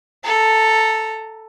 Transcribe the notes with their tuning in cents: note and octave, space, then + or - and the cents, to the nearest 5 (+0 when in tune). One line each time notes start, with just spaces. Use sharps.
A4 +0 A#5 -15